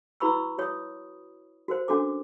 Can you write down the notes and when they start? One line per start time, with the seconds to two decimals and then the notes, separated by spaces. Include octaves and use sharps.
0.20 E4 F#4 B4 B5 C#6 E6
0.58 F#4 C#5 D#6
1.68 F#4 A#4 C5
1.88 C#4 D4 F#4 A4 D6